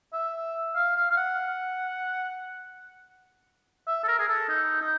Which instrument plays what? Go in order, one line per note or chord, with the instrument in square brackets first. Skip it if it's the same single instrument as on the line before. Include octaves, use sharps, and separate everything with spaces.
[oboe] E5
F5
F5
F5
F#5
E5
A4
A#4
G#4
A4
D#4
D#4